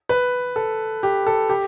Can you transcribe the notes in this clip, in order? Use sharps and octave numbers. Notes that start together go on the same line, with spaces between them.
B4
A4
G4
A4
G4